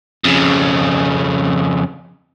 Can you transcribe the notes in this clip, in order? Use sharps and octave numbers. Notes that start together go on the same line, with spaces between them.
F2 C#3